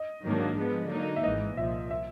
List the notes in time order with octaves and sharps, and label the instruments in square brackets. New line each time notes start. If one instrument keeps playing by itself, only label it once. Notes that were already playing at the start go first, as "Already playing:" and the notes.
Already playing: [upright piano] D#5
[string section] G#2 D#3 F#3 A#3 D4
F3 G#3 B3
D3 F#3 A#3 D#4
[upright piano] E5
[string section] G#1 G#2 E3 [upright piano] D#5
[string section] C2 A#2 F3 [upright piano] E5
[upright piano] E5